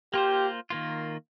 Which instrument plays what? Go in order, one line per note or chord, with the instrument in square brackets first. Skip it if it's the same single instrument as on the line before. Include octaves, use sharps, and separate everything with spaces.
[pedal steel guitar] A#3 F4 C5 [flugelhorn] G4
[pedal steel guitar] D#3 A#3 F4